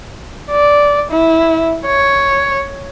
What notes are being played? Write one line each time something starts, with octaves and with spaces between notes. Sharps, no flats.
D5
E4
C#5